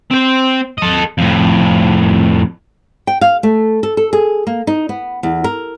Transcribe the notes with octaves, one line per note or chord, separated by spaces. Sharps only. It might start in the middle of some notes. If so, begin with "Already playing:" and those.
C4 C5
A4 D#5
F2 A2
G5
F5
A3
A4
A4
G#4
A#3
D#4
B3
E2
A#4